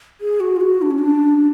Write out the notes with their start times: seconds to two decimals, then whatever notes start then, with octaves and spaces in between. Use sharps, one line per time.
0.21 G#4
0.40 F#4
0.56 F4
0.61 F#4
0.82 D4
0.91 C#4
0.99 D4